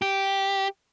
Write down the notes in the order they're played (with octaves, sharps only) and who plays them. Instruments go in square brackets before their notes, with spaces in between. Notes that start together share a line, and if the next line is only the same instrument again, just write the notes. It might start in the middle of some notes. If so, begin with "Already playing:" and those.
[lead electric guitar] G4